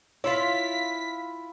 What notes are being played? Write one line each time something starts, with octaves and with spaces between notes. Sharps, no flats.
E4 F4 C#5 C6 B6